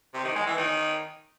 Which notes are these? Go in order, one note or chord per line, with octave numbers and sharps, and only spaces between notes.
C3
D#3
G#3
E3
D#3